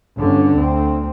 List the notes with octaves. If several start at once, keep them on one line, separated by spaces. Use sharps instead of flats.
G1 D3 C#4
D2 C4